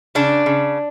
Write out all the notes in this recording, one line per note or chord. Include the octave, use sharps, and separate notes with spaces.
C#3 D4
C#3